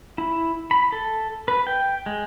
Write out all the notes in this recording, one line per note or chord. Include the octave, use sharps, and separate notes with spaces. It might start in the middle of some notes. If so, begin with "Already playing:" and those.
E4
B5
A4
B4
G5
G#3